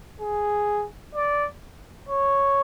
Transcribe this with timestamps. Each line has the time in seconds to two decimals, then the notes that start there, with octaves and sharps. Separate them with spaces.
0.20 G#4
1.15 D5
2.09 C#5